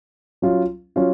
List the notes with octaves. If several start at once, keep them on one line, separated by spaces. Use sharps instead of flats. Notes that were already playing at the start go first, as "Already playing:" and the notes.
F#3 C#4 F4
F#3 C#4 F4